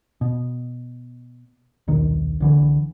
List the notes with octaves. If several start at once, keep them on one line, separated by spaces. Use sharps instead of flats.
B2
D#1 B1 D#3
C2 D3 E3